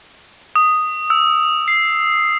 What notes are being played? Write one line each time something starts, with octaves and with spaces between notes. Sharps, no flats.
D#6
E6
C7